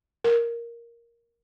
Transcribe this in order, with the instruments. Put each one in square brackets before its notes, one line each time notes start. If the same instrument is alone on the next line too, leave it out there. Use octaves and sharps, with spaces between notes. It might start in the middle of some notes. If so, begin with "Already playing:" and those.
[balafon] A#4